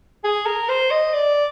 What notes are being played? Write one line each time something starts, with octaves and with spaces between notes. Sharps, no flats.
G#4
A#4
C5
D#5
D5